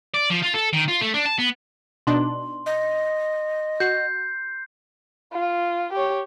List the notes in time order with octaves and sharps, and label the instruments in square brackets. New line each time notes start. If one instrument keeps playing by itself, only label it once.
[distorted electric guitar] D5
F3
F4
A4
D#3
F4
A3
D4
A5
B3
[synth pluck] B2 D4 D#4 [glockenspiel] C6
[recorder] D#5
[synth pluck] F#4 [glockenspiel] G6 C7
[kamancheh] F4
G4 C#5